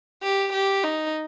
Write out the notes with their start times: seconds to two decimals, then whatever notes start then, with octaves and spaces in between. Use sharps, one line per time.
0.23 G4
0.53 G4
0.83 D#4